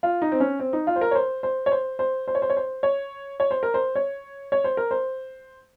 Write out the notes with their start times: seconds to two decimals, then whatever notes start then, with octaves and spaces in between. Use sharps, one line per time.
0.03 F4
0.22 D#4
0.32 C4
0.40 C#4
0.60 C4
0.73 D#4
0.87 F4
0.96 C5
1.01 A#4
1.11 C#5
1.15 C5
1.43 C5
1.66 C#5
1.71 C5
1.99 C5
2.28 C5
2.35 C#5
2.42 C5
2.50 C#5
2.57 C5
2.83 C#5
3.40 C#5
3.51 C5
3.63 A#4
3.74 C5
3.95 C#5
4.52 C#5
4.64 C5
4.77 A#4
4.91 C5